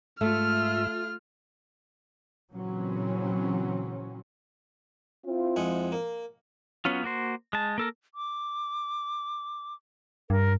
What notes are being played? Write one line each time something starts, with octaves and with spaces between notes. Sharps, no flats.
G#2 A3 F4 E5 F6
A#2 C#3 E3 F#3 C4 C#4
C4 E4 F4
F2 G#3 F#5
A#3
F#3 B3 C#4 F4
A#3 F#4 C5
G#3 A5
A#3 A4 A#4
D6
G2 A#4